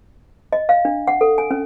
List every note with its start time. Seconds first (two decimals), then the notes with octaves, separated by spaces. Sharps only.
0.53 D#5
0.69 F5
0.85 D4
1.08 F#5
1.21 A4
1.38 G#5
1.51 C#4